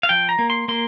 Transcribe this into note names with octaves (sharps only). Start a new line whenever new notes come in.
F5
F3 G5
A#5
A#3
C6
A#3 C6